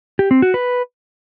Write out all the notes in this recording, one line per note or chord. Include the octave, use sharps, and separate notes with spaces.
G4
C4
F#4
B4